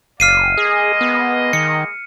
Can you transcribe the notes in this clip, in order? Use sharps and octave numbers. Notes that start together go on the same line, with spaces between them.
F#1 D5 F5 F6 C7 D#7
G#3 A#3 G#4 D#5
B3
D#3 C#7